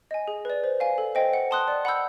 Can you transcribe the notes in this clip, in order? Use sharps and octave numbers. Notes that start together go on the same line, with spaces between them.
D#5 G#5
G#4
B4 D5
C5
F5 G#5
A4
C5 D#5 G5
F#5
A5 C6 D#6 F#6
D5
F#5 B5 E6 G6